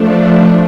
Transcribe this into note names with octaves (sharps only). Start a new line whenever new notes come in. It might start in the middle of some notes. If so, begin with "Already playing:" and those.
Already playing: F3 A3 D4